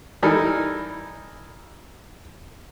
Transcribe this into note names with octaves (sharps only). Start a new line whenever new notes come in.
E3 G3 D#4 A4 A#4